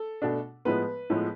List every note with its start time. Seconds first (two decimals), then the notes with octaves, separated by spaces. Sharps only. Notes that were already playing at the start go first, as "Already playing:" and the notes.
Already playing: A4
0.22 B2 A3 D4
0.65 A2 F3 G#3 B3 B4
1.10 A2 F3 G#3 B3